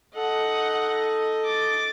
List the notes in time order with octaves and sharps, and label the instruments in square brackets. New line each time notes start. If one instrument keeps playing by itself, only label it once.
[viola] D#4 D#5 [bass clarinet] A4 [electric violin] F#5
[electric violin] D6 A6